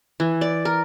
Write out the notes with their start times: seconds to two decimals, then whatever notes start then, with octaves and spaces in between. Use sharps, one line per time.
0.20 E3
0.41 D5
0.65 A#4